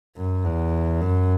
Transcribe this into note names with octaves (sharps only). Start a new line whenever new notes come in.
F#2
E2
F#2